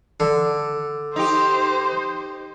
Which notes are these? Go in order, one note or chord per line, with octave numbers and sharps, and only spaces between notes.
D3
D#4 G4 C5